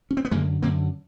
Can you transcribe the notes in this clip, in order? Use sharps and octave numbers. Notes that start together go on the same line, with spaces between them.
C#4
C4
B3
F#2 D3 G#3 A#3
F#2 D3 A#3 C4